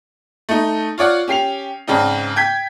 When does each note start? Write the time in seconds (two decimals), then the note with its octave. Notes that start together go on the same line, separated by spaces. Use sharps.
0.49 A3 D#4
0.98 F4 C#5 D5 F#5
1.28 C#4 G4 C7 F7
1.87 G#2 C#3 C4 D4 D#4
2.36 G5 G6 G#6 B6